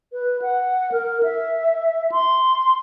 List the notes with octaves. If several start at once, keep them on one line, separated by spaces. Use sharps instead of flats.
B4
F#5
A#4
E5
C6